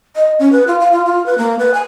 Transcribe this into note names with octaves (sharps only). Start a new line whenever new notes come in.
D#5
C#4
B4
F4
F5
F4
F4
B4
A#3
B4
G#5